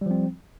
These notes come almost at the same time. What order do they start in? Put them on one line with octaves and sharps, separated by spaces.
G3 F3 C4